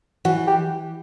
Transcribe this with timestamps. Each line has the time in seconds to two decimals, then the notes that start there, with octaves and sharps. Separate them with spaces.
0.25 E3 F#4
0.47 G4